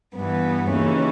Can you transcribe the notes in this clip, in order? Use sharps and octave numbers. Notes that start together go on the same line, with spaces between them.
G2 E3 B3
D#2 C#3 E3 C#4